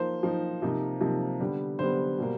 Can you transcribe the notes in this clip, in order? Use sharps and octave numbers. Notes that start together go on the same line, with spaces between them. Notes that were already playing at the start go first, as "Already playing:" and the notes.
Already playing: F3 A#3 D#4 C5
F3 A#3 D#4
C3 F3 A#3 D#4
C3 F3 A#3 D#4
D3 G3 B3
D3 G3 B3 C5
B2 G3 A#3